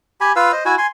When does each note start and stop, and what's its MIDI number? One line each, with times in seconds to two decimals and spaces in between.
0.21 0.32 67
0.21 0.32 80
0.21 0.32 83
0.36 0.52 65
0.36 0.52 71
0.36 0.52 77
0.36 0.52 88
0.52 0.64 72
0.52 0.64 75
0.65 0.76 64
0.65 0.76 66
0.65 0.76 80
0.78 0.87 80
0.78 0.87 84